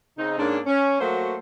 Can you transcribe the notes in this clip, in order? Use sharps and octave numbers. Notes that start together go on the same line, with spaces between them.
C#3 C4 D#4
G#2 A#3 C#4 D4
C#4
F#3 A3 A#3 F#4 C5